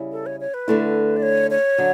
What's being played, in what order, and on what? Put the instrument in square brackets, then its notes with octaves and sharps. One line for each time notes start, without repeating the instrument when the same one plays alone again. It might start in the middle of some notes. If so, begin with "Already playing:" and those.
Already playing: [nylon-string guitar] C#3 G3 C#4 E4
[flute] A4
C#5
C#5
B4
[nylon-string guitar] D3 A3 E4
[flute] D5
C#5
C#5
[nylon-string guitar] D3 F#3